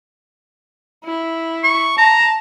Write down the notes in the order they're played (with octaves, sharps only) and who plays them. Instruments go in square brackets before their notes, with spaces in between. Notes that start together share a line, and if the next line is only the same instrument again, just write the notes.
[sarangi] E4
[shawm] C#6
[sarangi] A5 [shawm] A#5